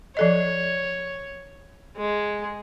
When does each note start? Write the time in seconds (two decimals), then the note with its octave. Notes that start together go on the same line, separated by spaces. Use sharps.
0.17 F3 A4 C#5 D#5
1.97 G#3